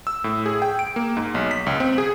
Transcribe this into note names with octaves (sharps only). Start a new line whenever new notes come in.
E6
A2
G#4
G5
D7
A#3
G#2
B1
B6
C#2
C4
G#4